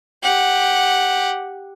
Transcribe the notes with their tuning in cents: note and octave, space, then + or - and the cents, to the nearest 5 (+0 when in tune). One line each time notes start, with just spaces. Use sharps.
G4 +0 F#5 -5